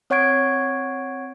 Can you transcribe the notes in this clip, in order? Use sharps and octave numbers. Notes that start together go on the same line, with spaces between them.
C4 C#5 F#5 C#6 G#6 D7